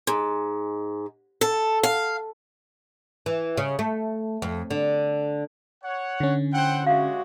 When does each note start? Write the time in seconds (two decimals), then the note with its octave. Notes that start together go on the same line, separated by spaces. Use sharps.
0.07 G#2
1.41 A4
1.83 F5
3.26 E3
3.58 C#3
3.79 A3
4.42 F2
4.70 D3
5.83 C#5 F#5
6.20 D3 C#4
6.54 E4 C5 F#5 G5
6.87 G#3 F#4 G4 C#5 E5 F5